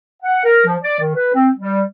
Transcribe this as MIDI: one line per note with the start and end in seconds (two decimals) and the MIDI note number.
0.22 0.43 78
0.44 0.61 70
0.66 0.76 53
0.82 0.98 74
1.00 1.14 51
1.15 1.32 71
1.34 1.49 60
1.58 1.82 55